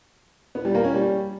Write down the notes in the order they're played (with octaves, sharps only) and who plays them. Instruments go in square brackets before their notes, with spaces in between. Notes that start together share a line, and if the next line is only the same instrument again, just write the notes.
[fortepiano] B3
G3
A#3
C#4
G3